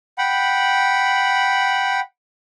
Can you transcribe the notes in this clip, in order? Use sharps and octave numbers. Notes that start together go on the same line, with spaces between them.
F#5 G5 B5